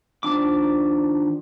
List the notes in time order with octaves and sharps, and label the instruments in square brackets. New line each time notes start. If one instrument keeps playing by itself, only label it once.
[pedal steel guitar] D#3 F3 D4 D6